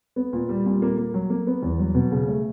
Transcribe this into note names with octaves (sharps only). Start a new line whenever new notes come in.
B3
A#2
G3
A#2
A#3
A#3
F#3
A#3
B3
E2
F#3
B2
C#3
A3